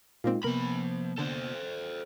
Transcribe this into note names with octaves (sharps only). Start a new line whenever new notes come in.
A#2 G#3 A#3 C4 D#4 F4
C3 F3 A#3 B3 A#4 B5
D3 A4 C5 A5